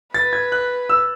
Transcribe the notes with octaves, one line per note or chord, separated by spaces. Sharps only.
B4 A6
G#6
F#6
E6